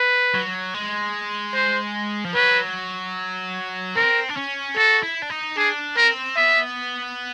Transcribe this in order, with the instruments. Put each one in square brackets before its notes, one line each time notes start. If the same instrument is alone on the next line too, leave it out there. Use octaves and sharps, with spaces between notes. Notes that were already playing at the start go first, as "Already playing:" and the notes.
Already playing: [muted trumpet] B4
[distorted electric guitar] F#3
G#3
[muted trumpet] C5
[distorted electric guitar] F3
[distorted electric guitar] F#3 [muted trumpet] B4
[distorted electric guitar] C4 [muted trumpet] A#4
[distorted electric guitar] D4
C#4
[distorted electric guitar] F#4 [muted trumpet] A4
[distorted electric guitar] E4
D4
D#4
[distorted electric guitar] D4 [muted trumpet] G#4
[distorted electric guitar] C4 [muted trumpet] A#4
[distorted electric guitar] B3 [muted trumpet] E5